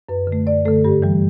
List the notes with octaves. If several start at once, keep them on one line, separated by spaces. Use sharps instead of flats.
F#2 B4
D3
A3
F#2 D5
D3 A3 A4
G2 G4
E3 G3